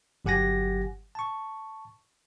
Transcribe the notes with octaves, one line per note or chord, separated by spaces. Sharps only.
G1 F#3 G4 F#5 G#5 A#6
A5 C#6